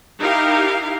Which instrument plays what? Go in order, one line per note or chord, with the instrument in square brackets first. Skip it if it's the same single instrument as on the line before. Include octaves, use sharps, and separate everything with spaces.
[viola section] D#4 E4 G4 A#4 F5